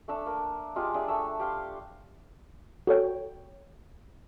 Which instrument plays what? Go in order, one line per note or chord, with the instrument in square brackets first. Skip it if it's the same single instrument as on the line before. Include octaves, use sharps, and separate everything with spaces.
[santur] A3 D4 E5
A#3
G#3 F4 G4 D6
D4 G#4 E5
A3 E5 E6
G4 F5 C6
[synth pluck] F#4 A4 C#5 G5